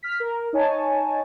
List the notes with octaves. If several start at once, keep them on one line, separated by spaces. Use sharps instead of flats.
F6 B6
A#4
D#4 C#5 G#5 A5